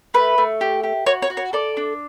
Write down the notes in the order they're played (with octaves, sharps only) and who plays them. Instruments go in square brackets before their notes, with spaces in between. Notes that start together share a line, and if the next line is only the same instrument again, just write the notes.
[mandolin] A3 B4
A3
G4
G4
F#4 C#5
C#5
F#4
C#5
A4 D5
D4